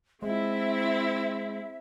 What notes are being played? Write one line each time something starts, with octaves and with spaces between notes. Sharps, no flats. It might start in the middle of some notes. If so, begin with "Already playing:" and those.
G#3 C4 E4 E5